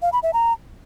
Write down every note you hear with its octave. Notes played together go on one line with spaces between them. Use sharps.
F5
B5
E5
A#5